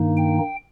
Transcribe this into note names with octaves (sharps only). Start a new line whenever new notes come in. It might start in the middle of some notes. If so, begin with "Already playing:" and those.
Already playing: G2 D#3 A#3 D#4
G5